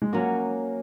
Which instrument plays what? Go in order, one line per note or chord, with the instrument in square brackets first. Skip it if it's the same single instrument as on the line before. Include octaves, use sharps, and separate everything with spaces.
[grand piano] G#3
[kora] F#3 C#4 F#4 [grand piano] A#3